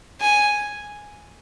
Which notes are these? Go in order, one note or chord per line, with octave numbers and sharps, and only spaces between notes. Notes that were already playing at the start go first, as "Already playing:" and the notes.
G#5